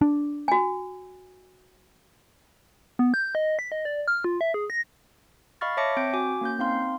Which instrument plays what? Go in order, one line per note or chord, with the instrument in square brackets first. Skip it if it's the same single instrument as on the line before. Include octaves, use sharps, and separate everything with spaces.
[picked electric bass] D4
[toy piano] F#4 G#5
[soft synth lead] B3
G6
D#5
B6
D#5
D5
F6
F4
E5
G#4
A#6
[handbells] D#5 F5 B5 C#6 F6 A6
C#5 E5 A5 D6 A#6 C#7
C4 G6 D7
F#4 G#5 D6
A#3 C#4 G6
C4 D#4 F5 C6